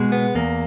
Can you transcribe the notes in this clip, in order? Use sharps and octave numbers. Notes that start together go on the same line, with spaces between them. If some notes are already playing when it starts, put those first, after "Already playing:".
Already playing: B2 G#3
B3
E2 A#3